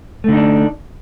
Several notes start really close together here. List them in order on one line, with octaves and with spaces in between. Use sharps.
A3 D3 D#4 D4